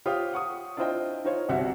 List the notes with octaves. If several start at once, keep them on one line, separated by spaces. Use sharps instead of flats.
F4 G4 C5 C#5 F5 D#6
F#5 C#6 D#6
D4 E4 F4 C5 D#5 G5
D#4 F4 C5 C#5
G1 C2 F#4 E5 F#5